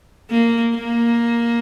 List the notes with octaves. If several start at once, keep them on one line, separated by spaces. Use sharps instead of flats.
A#3
A#3